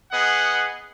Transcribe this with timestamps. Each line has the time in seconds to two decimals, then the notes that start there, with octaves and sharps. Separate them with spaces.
0.11 B3 G#4 D#5 F#5